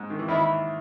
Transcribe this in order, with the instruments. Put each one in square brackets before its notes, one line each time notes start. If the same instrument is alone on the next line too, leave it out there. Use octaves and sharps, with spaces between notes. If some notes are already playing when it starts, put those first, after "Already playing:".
Already playing: [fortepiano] G#2
D#3
E3
[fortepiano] D#2 D#3 [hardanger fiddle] E4